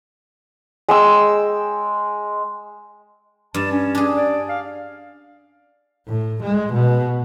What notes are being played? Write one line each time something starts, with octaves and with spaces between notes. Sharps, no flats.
G#3 G5 E6
G2 A5
C#4
D4 G#4
D5
F5
A2
G#3
B2